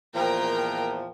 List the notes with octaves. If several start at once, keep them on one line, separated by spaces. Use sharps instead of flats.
E2 A#2 F3 A#4 G5